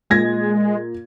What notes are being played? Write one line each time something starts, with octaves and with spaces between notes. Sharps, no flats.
A#2 G#3 G#6 A#6